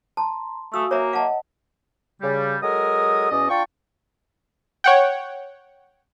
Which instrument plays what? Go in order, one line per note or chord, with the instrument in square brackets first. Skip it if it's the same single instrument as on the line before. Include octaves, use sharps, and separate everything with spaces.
[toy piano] A5 [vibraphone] A#5 C6
[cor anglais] A3 [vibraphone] F#4 F5 G#5 [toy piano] D#6 E6
[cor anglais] A#3 [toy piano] C#5 E5 A#5
[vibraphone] D#5 F#5 [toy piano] F5 A5
[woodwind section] C#3 G3
F#3 G#3 A4 A#4 D#6
E2 B2 C#4 D5 D#5
D4 F4 G5 A5 C#6
[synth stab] C#5 F#5 G5